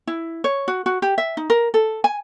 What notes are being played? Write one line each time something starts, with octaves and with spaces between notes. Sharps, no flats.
E4
C#5
F#4
F#4
G4
E5
D#4
A#4
A4
G#5